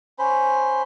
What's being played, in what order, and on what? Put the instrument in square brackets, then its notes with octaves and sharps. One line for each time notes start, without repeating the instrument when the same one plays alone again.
[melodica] C#4 C5 B5